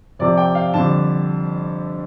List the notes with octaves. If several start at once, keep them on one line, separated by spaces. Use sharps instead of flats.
F2 C3 F3 D5
G5
F5
F2 D3 G3 A5